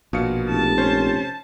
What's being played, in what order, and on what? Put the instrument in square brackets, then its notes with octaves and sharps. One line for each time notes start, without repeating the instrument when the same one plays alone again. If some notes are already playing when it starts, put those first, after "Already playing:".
[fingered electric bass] A#1 [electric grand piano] B2 F5 C#7
[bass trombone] F1 [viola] A5
[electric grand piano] C#4 C5